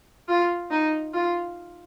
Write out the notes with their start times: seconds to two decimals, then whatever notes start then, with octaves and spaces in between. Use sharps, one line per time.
0.28 F4
0.71 D#4
1.14 F4